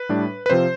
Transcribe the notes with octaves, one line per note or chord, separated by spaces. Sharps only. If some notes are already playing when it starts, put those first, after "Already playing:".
Already playing: B4
A2 G3 D4
B4
C3 F3 C4 F4 C5